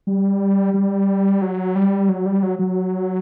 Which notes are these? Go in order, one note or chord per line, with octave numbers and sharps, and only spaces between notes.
G3
G3
F#3
G3
F#3
G3
F#3
F#3